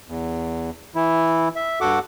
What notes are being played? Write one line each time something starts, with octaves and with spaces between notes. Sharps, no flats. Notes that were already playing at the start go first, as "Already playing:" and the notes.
E2
E3 E4
E5
G2 F#4 A4 F#5 D6